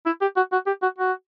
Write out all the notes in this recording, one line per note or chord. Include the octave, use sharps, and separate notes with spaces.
E4
G4
F#4
F#4
G4
F#4
F#4